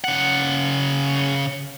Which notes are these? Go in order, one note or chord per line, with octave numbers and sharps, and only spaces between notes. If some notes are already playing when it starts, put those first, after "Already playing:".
C#3 F#5